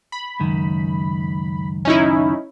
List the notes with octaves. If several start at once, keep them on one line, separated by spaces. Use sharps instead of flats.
B5
C#2 F#2 D#3
C#4 D#4 E4